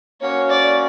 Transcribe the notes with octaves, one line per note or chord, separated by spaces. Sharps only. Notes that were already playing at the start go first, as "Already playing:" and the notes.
A#3 C#4 F#4 C#5
D5